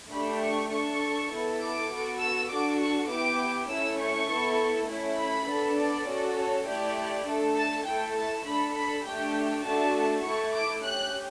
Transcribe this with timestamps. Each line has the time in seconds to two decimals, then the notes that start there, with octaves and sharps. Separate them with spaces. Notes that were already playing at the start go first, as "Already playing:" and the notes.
0.12 A3 D4 G4 B5
0.41 C#6
0.71 D4 A4 C#6
1.31 B3 E4 A4
1.60 D6
1.90 B3 F#4 A4
2.20 E6
2.50 D4 F#4 A4 D6
2.79 C#6
3.09 B3 E4 G4 D6
3.69 A3 C#4 E4 E6
3.98 C#6
4.28 B3 E4 A4
4.88 A3 C#4 E4
5.18 B5
5.47 B3 D4 A4
5.78 D5
6.07 C#4 F#4 A4
6.37 C#5
6.66 A3 E4 G4 D5
7.26 A3 D4 A4
7.56 A5
7.85 A3 E4 A4 G5
8.15 A5
8.44 D4 A4 B5
8.75 B5
9.05 A3 D4 G4 G5
9.64 A3 D4 F#4 A4 A5
10.23 A3 E4 A4 C#6
10.53 D6
10.83 C#4 G4 F#6